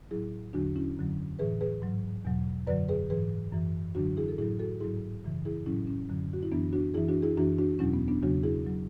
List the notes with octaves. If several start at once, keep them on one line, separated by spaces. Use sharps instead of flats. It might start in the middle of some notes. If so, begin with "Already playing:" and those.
A2 F#3 E4 G#4
E2 D3 F#3 D4 F#4
C#4 E4
F#2 D3 F#3
A2 E3 G#4 B4
G#4 B4
G#2 F#3
E2 B2 F#3
F#2 D3 F#3 B4 D5
G#4 B4
G#2 E3 G#4 B4
F#2 E3
F#2 D3 F#3 D4 F#4
E4 G#4
A4
A2 F#3 E4 G#4
F#4 A4
G#2 F#3 E4 G#4
F#2 C#3 E3
E4 G#4
A2 F#3 C#4 E4
C#4
F#2 D3 F#3
F#4
E4
F#2 E3 B3 D4
D4 F#4
F#2 E3 E4 G#4
D4 F#4
E4 G#4
F#2 E3 D4 F#4
D4 F#4
E2 B2 F#3 C#4 E4
B3
B3 D4
E2 C#3 F#3 D4 F#4
E4 G#4
F#3